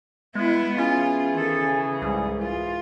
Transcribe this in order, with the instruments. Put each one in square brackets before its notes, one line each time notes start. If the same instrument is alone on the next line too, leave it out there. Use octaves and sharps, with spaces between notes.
[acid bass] G#3 [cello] B3 E4
[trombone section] E3 G#4 [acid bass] C#4 [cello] F4
[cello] D#3 A4
C#3
[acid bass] C2 [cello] G#2
[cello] F4